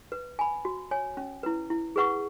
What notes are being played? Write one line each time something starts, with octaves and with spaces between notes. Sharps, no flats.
B4
G#5 B5
F#4
C#5 G#5
C#4
E4 B4
E4
G#4 B4 F#5 C#6